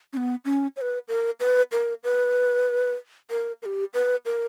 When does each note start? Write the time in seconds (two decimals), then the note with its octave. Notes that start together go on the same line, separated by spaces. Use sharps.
0.13 C#4
0.17 B3
0.45 C#4
0.76 C#5
0.81 B4
1.08 A#4
1.40 B4
1.72 A#4
2.04 B4
3.30 A#4
3.62 A#4
3.66 G4
3.94 B4
4.25 A#4